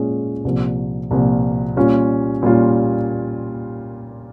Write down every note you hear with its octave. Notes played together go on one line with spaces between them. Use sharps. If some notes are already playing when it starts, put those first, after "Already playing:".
Already playing: A#2 G#3 C#4 F4 G#4
C2 A#2 F3
C2 A#2 F3
A#2 G3 C#4 F4
A#2 G3 C#4 F4